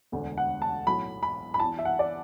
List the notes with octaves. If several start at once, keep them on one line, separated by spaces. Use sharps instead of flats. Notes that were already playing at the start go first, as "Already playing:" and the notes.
E1 D2 D3
F#5
A5
B1 A2 F#3 B5
B5
B5
E2 E3 A5
E5
F#5
D5